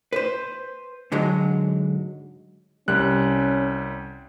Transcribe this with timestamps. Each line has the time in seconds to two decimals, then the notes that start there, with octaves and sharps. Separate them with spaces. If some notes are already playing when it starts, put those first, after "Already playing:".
0.13 B4 C5
1.12 G#2 D3 F#3 G#3
2.88 C2 G3 C#4 F#6